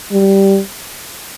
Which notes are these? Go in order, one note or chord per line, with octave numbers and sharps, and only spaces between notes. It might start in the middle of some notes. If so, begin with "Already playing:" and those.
G3